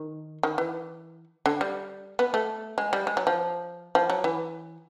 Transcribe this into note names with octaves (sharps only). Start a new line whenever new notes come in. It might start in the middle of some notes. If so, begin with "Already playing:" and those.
Already playing: D#3
D#3
E3
D3
G3
B3
A3
G#3
G3
G#3
F#3
F3
F3
F#3
E3